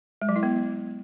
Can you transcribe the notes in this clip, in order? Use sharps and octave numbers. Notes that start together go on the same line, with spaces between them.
G#3
F#3
E4
B3